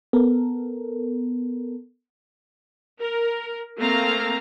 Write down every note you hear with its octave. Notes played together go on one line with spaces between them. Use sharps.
B3 A4 A#4
A#4
A3 A#3 C4 F5 A#5